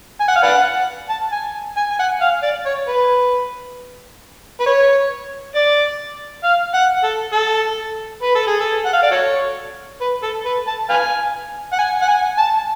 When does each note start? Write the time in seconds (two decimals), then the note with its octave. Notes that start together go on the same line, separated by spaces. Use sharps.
0.20 G#5
0.28 F#5
0.36 F5
0.43 B4 D5 F#5
1.09 A5
1.32 G#5
1.77 G#5
1.91 G#5
1.99 F#5
2.21 F5
2.43 D5
2.65 C#5
2.88 B4
4.60 B4
4.66 C#5
5.55 D5
6.44 F5
6.74 F#5
7.03 A4
7.33 A4
8.22 B4
8.35 A4
8.47 G#4
8.60 A4
8.85 F#5
8.93 F5
9.03 D5
9.11 F#4 A4 C#5
10.01 B4
10.23 A4
10.45 B4
10.67 A5
10.89 B4 F5 G#5
11.72 F#5
11.78 G#5
12.02 F#5
12.08 G#5
12.38 A5